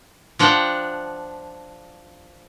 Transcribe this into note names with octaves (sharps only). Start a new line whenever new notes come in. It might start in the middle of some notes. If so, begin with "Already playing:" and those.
F3 D4 F#5 G5